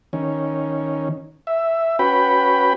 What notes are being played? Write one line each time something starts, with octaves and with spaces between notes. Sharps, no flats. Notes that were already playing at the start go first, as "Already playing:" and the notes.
D#3 C#4
E5
C#4 F#4 B4 G5 B5